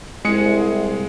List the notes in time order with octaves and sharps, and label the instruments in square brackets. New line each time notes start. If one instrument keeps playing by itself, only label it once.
[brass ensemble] C2 [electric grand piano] G#3 G#4 C#7